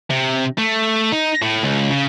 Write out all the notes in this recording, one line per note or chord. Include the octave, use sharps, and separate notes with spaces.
C3
A3
D#4
A2
C#2
C#3